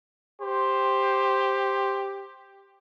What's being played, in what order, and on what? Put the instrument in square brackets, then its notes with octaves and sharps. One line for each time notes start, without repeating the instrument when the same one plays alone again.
[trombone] G4 [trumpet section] C5